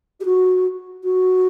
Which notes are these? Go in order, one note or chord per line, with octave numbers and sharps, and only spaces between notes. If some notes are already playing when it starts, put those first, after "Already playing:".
G4
F#4
F#4